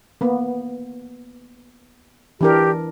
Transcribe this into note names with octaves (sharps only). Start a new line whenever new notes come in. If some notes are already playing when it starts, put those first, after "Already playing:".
A#3 B3
E3 D4 G4 A#4